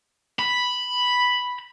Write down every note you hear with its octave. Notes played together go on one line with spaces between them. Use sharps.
B5